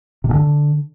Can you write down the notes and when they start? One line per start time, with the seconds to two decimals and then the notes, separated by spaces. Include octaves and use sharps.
0.24 C3
0.29 A#2
0.34 D3